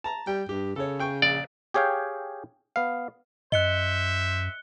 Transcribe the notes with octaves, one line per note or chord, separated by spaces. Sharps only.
A5 A#5
G3 G5
G2 G4
C#3 A4 C#5
G#4 G5 C#6
A#1 D5
G4 G#4 C#5 F5 G5
B3 F5
F#2 C5 D#5 E5 F#6 C#7 G7